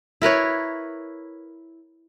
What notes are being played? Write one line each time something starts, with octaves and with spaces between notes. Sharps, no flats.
E4 A#4 B4 C#5